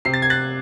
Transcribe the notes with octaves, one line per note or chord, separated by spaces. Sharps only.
C3 C7
A6
G#6
F#6 A6